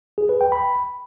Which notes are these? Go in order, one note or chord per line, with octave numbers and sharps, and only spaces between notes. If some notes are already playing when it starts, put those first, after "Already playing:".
G#4
B4
G5
B5